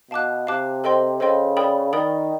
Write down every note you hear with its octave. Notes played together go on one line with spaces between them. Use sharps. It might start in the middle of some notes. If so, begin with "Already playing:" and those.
B2 F5 A5 D6 F#6
C3 F5 A5 D6 F#6
A4 C5 D#5 G5 C6
C#3 A4 C5 D#5 G5 C6
A#4 D5 G5 B5 D#6
D#3 A#4 D5 G5 B5 D#6